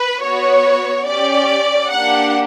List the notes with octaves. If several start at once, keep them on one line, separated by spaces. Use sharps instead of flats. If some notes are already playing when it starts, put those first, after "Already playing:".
Already playing: B4
B3 F#4 C#5
C#4 G4 D5
A#3 D4 G4 F#5